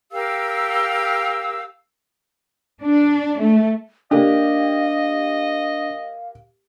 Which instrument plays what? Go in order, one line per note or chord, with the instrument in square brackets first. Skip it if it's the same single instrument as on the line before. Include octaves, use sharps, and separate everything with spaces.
[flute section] G4 A#4 F5 E6
[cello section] D4
A3
[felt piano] A#3 G4 [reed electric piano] D4 [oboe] D#5 [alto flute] F5